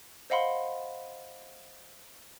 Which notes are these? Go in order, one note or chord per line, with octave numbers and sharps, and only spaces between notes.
C5 D#5 F5 F#5 B5 C6